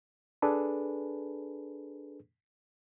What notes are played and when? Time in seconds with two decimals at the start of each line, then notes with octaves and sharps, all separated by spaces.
0.42 D4 G#4 A4 B4